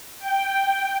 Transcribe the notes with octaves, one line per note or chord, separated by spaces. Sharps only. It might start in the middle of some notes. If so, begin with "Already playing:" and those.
G5